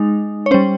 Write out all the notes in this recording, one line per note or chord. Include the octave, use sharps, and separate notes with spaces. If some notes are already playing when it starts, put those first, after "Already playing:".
Already playing: G#3 D#4
C#5
G3 C#4 C5